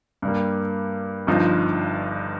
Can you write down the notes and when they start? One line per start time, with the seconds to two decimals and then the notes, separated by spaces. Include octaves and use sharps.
0.22 G2 G3 A#3
1.27 G1 G2 F3 D#4